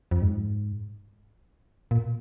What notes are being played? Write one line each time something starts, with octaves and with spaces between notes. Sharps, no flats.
F2
G#2
A#2